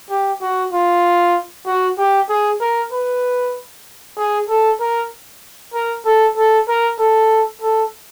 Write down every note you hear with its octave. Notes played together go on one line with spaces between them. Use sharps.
G4
F#4
F4
F#4
G4
G#4
A#4
B4
G#4
A4
A#4
A#4
A4
A4
A#4
A4
A4